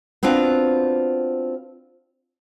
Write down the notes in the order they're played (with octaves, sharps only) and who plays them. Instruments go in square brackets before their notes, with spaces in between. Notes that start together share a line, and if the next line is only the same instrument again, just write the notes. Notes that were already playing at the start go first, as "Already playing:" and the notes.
[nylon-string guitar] B3 C4 D4 F4 F#4